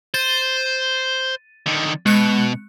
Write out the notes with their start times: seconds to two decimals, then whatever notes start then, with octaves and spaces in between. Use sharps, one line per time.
0.14 C5 A6 D#7
1.66 D3 D#3
2.06 B2 G#3 F#6 C#7